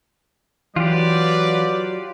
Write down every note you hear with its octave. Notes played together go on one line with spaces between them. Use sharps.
E3 F#3 F4 G4 B4 D5